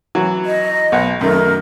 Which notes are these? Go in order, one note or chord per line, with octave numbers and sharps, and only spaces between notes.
E3 F#3 F#4
D#5
B1 F#5
F#2 D#3 A3 A#4